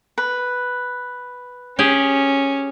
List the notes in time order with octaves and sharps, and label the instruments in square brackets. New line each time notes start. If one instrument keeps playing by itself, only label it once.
[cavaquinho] B4
[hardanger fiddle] C#4 [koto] G4 G#4